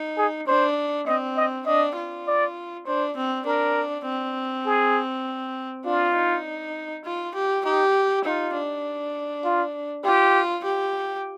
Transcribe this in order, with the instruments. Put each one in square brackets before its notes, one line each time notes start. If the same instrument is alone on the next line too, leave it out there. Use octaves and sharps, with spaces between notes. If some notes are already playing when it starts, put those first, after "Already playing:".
Already playing: [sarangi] D#4
[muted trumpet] G#4
[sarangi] D4 [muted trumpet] C5
[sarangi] C4 [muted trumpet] D#5
[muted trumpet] D#5
[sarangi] D4 [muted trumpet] D#5
[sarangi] F4
[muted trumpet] D5
[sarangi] D4 [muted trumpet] C5
[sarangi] C4
[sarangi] D4 [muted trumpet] A#4
[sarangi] C4
[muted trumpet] G#4
[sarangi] D4 [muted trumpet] F4
[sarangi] D#4
F4
G4
[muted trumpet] D#4 [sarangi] G4
[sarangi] D#4 [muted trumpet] F4
[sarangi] D4
[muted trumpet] F4
[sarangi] F4 [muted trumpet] G4
[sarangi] G4